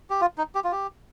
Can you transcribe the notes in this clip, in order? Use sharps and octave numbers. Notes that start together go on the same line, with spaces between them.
G4
F4
D#4
G4
F4
G4